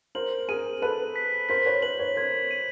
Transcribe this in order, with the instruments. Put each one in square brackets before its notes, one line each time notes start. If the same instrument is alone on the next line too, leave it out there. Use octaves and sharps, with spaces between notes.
[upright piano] A#4 C5 [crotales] F#7
[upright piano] G#4 A#4 [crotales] D#7
[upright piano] A4 B4 [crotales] D#7
[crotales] B6
[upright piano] A#4 C5 [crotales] B6
[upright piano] B4 C#5
[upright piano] B4 C#5 [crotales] F#7
[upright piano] B4 C#5
[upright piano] A#4 C5 [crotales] G#6
[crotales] D#7